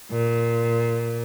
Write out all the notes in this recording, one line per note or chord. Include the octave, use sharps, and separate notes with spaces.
A#2